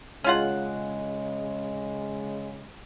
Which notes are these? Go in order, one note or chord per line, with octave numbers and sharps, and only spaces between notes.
C#3 G#3 C#4 F4 F#5